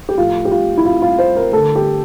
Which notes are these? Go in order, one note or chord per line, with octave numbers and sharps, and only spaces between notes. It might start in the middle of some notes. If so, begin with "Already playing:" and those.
G4
A2 F3 A3 F4
G4
F4
E4
F4
F4
C5
A#4
D3 A3 A4
G4